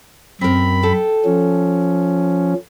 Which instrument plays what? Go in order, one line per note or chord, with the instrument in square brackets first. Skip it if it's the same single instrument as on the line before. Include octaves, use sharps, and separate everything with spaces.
[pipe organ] F#2 B5 [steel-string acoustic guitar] C4 A#4
[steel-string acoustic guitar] A4 G5
[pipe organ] F3 C#4